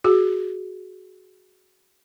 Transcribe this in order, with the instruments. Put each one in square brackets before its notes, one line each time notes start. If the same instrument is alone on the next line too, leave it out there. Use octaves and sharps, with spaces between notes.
[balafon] F#4 G#4